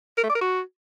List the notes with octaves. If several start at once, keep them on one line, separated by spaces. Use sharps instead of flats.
A#4
A3
D5
A#4
F#4